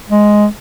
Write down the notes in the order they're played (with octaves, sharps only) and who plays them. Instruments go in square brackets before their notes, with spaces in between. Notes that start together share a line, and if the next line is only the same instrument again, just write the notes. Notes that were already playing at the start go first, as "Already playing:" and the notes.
[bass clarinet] G#3